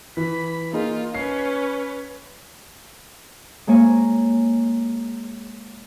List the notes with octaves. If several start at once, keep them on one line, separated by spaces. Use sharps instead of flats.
E3 B5
A#3 D#4 F4 G#4
C#4 B4 C7
G#3 A#3 C#5 G#5